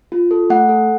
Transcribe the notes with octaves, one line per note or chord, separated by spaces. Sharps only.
F4
A4
A3 F#5
A4